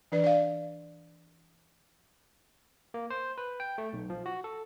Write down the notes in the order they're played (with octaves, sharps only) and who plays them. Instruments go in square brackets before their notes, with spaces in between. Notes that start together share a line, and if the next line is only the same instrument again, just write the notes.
[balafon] E3 D4 B4 D5
D5 F5
[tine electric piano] A#3
C5
B4
G5
A3
B1
F3
F#4
A4